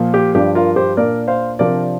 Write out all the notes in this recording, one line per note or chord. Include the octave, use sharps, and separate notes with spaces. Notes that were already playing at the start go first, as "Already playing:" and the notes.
Already playing: A#2 F3 A#3
G4
G2 F3 D4 G4
F4 A#4
G4 C5
A#2 A#3 D4 A#4 D5
C5 F5
C3 F3 D4 A#4 D5